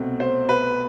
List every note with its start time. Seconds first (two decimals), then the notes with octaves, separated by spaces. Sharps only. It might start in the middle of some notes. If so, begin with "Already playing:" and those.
Already playing: C2 B2 A3 C4
0.20 C5
0.49 B4